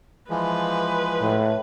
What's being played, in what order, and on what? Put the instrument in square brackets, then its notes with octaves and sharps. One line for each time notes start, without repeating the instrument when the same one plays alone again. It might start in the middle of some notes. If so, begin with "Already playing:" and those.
[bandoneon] E3 F3 G#3 [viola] B4
[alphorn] A2